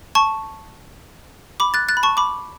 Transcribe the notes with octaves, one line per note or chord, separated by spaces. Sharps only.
A5 C#6
B5 D6
F#6 A6
F#6 A6
B5
A5 C#6
B5 D6